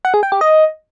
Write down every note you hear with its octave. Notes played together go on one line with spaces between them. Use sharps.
F#5
G#4
G5
G4
D#5